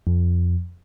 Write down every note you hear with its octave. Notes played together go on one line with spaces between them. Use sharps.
F2